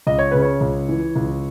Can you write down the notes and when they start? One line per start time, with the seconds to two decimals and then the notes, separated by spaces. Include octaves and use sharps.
0.07 C#2 D#5
0.19 C#5
0.31 C#3 B4
0.42 C#5
0.61 C#2
0.89 E3
1.16 C#2